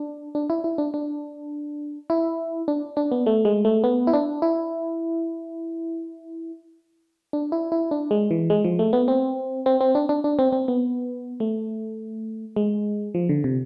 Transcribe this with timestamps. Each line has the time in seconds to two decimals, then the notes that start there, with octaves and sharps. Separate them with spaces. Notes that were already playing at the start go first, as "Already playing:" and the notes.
Already playing: D4
0.35 D4
0.50 E4
0.64 E4
0.78 D4
0.94 D4
2.10 E4
2.68 D4
2.97 D4
3.12 B3
3.26 A3
3.45 G#3
3.65 A3
3.84 B3
4.07 E4
4.13 D4
4.42 E4
7.33 D4
7.52 E4
7.72 E4
7.91 D4
8.11 G#3
8.31 E3
8.50 G#3
8.64 F3
8.79 A3
8.93 B3
9.08 C4
9.66 C4
9.81 C4
9.95 D4
10.09 D4
10.24 D4
10.39 C4
10.52 C4
10.68 B3
11.40 A3
12.56 G#3
13.15 F3
13.29 D3
13.44 C3